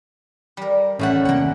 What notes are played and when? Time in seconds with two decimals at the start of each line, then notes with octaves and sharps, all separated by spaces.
0.57 G3 A#4
0.99 A1 A2 A3 C#4 F#5
1.25 D#2 C3 A#3 B3 F#5